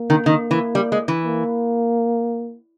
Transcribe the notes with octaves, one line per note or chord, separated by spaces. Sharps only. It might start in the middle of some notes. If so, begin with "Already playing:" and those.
Already playing: A#3
D#3
D#3
E3
G3
G#3
E3
A#3